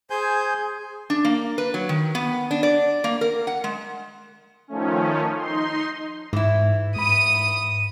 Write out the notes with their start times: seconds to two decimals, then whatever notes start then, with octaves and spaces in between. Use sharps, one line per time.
0.10 G#4 C5 G#5 G6
1.10 D4
1.25 A#3
1.58 B4
1.74 F#3
1.89 D#3
2.15 B3
2.51 D4
2.63 D5
3.04 A#3
3.21 A#4
3.47 F#5
3.64 G#3
4.68 D#3 F3 A3 C#4
5.36 D#4 C6
6.33 G#2 E3 E4
6.96 G#2 B5 D#6 D#7